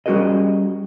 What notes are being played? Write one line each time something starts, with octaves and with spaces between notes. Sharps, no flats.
G3 C#4 F#4 G#4 A#4 D#5